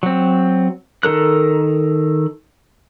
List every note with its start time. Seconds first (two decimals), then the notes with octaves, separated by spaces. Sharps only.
0.03 F#3 C4
1.03 D#3 A4 A#4 F#6